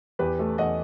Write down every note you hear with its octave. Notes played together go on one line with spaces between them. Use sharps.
E2 G4 B4
A3
E2 D#5 F#5